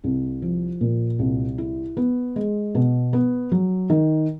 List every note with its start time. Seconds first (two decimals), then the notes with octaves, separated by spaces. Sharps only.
0.04 C2
0.42 F3
0.81 A#2
1.19 C2
1.58 E4
1.97 B3
2.36 G#3
2.75 B2
3.13 B3
3.52 F#3
3.90 D#3